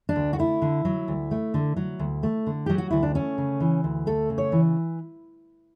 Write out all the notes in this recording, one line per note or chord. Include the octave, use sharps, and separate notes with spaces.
D4
D2
F#4
A3 E4
D3
F#3
D2
A3
D3
F#3
D2
A3
D3
F#3 G4
F#4
D2 E4
D4
A3 C#4
C#3
E3
D2
A3 A4
C#3
C#5
E3